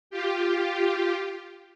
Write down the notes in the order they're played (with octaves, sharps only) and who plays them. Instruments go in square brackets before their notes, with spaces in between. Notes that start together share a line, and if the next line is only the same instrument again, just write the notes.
[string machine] F4 G4